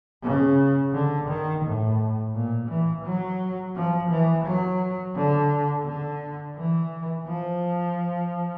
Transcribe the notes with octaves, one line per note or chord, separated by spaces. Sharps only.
C#3
D3
D#3
A2
A#2
E3
F#3
F3
E3
F#3
D3
D3
E3
F3